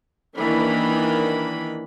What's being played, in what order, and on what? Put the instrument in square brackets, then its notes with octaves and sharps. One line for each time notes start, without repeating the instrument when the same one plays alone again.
[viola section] D#3 E3 A#3 D4 B5